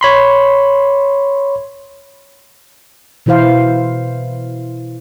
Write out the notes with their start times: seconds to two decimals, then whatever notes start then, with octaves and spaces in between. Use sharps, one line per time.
0.01 C#5 B5 C6
3.26 B2 E3 E4 C5 F5